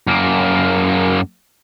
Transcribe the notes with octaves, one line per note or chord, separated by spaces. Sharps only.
F#2 A#3